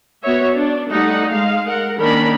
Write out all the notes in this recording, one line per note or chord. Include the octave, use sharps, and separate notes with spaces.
B3 F#4 C#5 E5
D4
G3 A3 D#4 F#5
G#3 F5
A#4 F#5
D#3 A#3 C#4 D4 A#4 B5